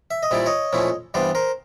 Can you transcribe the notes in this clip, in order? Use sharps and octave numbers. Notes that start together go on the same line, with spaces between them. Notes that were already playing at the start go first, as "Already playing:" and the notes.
E5
D#5
A#2 G3 C4 E4 D5
C#5 D#5
A#2 F3 A3 C#4 E4
G2 E3 G3 B3 C5 D5
A#4 C5